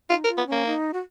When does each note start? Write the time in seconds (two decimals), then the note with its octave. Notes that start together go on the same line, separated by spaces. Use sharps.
0.10 D#4 F4
0.24 A#4
0.28 F4
0.38 B3
0.47 A#3 C#4
0.66 D#4
0.93 F#4